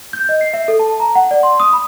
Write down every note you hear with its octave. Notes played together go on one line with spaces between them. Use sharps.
G6
D#5
C7
E5
A4
A5
A#5
F#5
D5
C6
D#6
B5